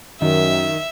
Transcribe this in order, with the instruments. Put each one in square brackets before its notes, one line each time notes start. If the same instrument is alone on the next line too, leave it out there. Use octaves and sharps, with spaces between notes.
[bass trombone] F#2 [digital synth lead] D#3 [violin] E5